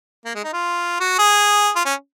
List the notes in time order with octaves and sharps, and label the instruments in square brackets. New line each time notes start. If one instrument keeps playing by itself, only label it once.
[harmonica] A#3
G#3
D#4
F4
F#4
G#4
F4
C#4